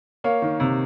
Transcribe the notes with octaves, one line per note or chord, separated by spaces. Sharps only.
A#3 C#5 F5
D#3
C3